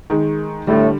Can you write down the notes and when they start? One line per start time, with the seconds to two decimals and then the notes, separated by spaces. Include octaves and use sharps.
0.10 D#3 G#3
0.67 A2 D3 G3 A3